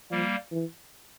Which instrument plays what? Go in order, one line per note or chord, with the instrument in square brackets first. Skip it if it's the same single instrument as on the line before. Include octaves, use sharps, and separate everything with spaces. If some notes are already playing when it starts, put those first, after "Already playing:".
[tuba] F3 [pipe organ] G3 A#3
[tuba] E3